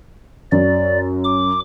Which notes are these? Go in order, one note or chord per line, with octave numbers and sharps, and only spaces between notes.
F#2 D5
D6